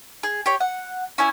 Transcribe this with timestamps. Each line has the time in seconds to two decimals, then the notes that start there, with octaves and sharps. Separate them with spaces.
0.23 G#4
0.46 G4 C#5
0.60 F#5
1.18 C#4 E4 G#5